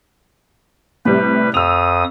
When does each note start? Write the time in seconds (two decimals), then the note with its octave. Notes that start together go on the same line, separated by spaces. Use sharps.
1.05 A2 C3 G3 B4
1.54 F2 D#6 E6 F7